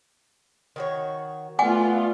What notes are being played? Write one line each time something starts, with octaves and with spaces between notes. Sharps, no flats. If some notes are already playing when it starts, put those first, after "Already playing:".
D#3 F#4 C#5
A3 B3 D4 F4 F#5 G#5 D6